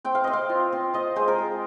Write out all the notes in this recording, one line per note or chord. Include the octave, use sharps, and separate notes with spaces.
C4 G5
F5
C4 D#5
F5
F4
C4
F4 D#5
G#3 C5
A#4
G#3